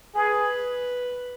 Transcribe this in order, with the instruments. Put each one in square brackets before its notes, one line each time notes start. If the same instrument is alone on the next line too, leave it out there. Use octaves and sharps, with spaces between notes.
[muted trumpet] G#4 [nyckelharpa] B4